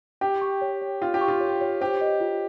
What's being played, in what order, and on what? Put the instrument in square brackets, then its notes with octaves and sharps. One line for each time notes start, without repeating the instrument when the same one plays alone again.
[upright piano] G4 [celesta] G5
[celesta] C#6
C#5
C#5
[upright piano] F4 [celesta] G5
[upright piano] G4
[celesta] C#6
[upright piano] F4
[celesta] C#5
C#5
[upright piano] G4 [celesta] C5
[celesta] D#5
F4